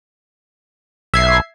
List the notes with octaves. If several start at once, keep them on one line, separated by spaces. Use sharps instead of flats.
B1 E5 G#6 C7